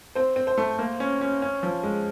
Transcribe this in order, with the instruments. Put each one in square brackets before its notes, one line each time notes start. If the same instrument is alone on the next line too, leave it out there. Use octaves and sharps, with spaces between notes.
[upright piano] C4 C5
C4
C5
A3
A#3
C#4
C#4
C#4
F3
G#3